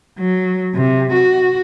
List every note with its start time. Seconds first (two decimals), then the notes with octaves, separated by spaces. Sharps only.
0.18 F#3
0.75 C3
1.13 F#4